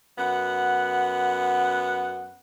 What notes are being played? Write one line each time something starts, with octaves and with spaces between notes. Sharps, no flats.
F#2 B3 F#5